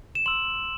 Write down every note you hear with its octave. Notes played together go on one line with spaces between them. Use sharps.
E7
C6 E6 F#7